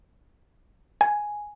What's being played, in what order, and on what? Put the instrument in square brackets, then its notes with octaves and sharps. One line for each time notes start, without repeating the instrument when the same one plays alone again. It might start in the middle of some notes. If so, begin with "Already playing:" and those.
[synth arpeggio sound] G#5